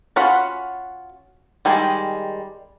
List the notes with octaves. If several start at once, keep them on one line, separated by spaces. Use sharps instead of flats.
C#4 F4 F#4 F#5 B5
D#3 G3 G#3 G#4